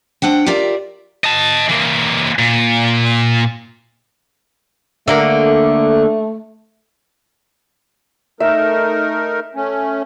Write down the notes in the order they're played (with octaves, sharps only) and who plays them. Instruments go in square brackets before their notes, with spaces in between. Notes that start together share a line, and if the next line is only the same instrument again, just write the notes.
[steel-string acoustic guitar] C4 D4 F#5 G5
F4 G4 A#4 D5 E5
[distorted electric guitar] D#5 A5
E3 A#3
A#2
[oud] D3 A#3 A#4 [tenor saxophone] A3
[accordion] A3 D#4 A#4 [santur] E5
[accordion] A3 C#4